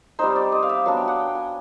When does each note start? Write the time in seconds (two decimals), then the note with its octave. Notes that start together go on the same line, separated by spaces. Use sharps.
0.19 G3 C4 D#4 C5
0.36 D5
0.52 D#5
0.62 F5
0.69 E5
0.86 F#3 B3 D4 F5
0.97 G5
1.08 F#5
1.19 G5
1.35 G#5